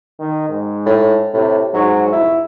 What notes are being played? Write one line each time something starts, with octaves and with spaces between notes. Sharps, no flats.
D#3
G#2
A2
A2 C3
G#2 F#3
F1 E4